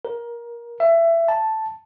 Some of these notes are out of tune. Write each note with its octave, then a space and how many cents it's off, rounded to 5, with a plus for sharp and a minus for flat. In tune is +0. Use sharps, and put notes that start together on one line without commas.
A#4 +20
E5 +20
A5 +0